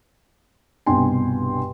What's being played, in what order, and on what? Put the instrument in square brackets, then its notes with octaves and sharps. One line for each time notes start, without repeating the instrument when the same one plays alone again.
[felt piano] C2 G2 B2 G5 G#5 C6